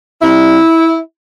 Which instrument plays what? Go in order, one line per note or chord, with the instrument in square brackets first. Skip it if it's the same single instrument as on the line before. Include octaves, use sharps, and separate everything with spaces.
[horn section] C3 G3 E4